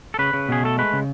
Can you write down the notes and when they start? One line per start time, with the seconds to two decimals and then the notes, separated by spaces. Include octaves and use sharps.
0.14 A4
0.19 C#3 B4
0.33 C#3
0.49 B2 G#4
0.63 A3 A4
0.78 G#3 B4
0.93 C#3